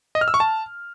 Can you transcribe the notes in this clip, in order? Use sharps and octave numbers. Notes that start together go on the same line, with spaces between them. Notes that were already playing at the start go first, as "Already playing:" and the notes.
D#5
F6
E6
C#6
A5